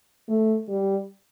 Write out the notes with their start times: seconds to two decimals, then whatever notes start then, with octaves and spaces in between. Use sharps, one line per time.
0.29 A3
0.68 G3